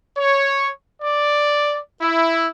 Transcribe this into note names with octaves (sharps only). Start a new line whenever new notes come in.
C#5
D5
E4